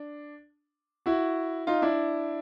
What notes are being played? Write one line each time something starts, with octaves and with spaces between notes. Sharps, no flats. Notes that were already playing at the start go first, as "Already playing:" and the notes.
Already playing: D4
E4 F#4
D#4 F4
D4 E4